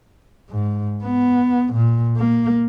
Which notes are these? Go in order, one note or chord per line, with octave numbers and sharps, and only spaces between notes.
G#2
B3
A#2
A#3